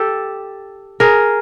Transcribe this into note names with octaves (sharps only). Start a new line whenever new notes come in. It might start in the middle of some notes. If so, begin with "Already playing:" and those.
Already playing: G4 A4
G#4 A#4